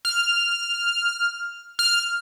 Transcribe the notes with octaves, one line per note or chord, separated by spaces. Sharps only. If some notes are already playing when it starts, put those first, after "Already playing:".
F6
F6